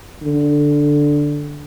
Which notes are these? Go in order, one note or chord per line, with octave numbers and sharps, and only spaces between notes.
D3